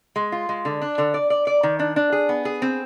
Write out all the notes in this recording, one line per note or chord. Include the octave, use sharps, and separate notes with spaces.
G#3
F4
G#3
D3
D4
D3
D5
D5
D5
D#3
D4
D4
G#4
B3
G#4
C4